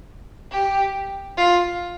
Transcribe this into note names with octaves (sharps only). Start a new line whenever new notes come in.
G4
F4